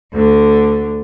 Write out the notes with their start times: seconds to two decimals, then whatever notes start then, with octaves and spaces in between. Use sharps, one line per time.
0.14 D2 D3